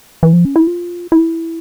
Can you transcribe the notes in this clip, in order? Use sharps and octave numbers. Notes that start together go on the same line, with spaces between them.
E3
F3
C#4
E4
F4
E4